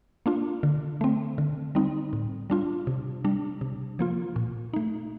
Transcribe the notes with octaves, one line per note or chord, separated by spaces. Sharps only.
A#3 D4 F4
D3
A3 C4
D3
G3 C4 D#4
A2
G3 D4 F4
C3
G3 D4
C3
F3 A#3 F4
A#2
A3 D#4